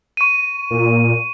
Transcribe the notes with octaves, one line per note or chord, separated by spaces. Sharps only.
C#6 D#7
A#2